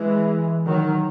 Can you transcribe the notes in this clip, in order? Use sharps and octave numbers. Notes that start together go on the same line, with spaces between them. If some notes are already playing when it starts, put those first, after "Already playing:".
Already playing: E3 G#3
D#3 F#3